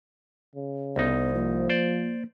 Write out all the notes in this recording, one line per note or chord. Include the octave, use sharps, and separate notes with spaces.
C#3
C2 B3 D#4
F3 A#3
C5 D5